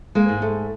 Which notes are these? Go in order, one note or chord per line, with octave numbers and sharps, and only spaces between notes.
G#3 A#3
G#2
A3